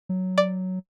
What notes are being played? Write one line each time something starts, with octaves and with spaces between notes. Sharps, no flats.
F#3
D5